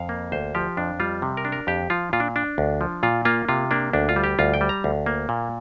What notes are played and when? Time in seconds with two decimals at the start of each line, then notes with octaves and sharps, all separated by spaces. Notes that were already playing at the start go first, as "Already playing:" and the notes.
Already playing: F2 F5
0.09 A#3
0.32 D2 C5
0.55 F3 G4
0.77 F2 D4
1.00 G3 F4
1.22 C3
1.37 A#4
1.45 D4
1.52 A#4
1.67 F2 G4
1.90 F3 F4
2.13 A#2 F4
2.20 D4
2.36 D4
2.58 D2
2.81 F3
3.03 A#2 F4
3.25 A#3 F4
3.49 C3 F4
3.71 A#3 D4
3.93 D2 D4
4.09 F4
4.16 G3
4.24 G4
4.39 D2 F4
4.54 G5
4.61 G3
4.69 A#5
4.84 D2
5.06 A#3
5.29 A#2